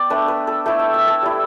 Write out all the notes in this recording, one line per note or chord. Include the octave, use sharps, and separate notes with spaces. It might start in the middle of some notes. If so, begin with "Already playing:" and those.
Already playing: B3 D5 G5
A3 D4 B4
B4
A4
A3 E4 G5
E5
E5
A4
G3 E4